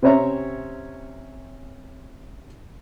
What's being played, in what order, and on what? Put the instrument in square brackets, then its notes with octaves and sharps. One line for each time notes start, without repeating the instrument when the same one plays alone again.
[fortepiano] C3 C4 C#4 C#5 E5 A#5